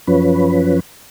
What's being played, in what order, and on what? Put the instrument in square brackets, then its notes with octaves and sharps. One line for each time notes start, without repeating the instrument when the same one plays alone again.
[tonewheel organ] F#2 F3 C#4 B4